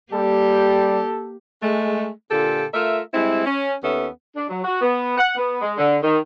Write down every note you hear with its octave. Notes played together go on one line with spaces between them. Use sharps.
G3 A#3 G4 A4
G#3 A3
A#2 D3 F4 G4 A4
A3 F4 A#4 E5
G3 G#3 C4 E4
C#4
D#2 B3 C#4 A4 E5
D4
F#3
F#4
B3
F#5
B3
G#3
D3
D#3